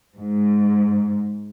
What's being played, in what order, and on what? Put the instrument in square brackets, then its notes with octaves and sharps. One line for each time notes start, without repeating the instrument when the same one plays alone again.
[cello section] G#2